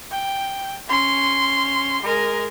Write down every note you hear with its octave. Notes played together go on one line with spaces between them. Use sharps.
G5
C#4 C6
G#3 A#4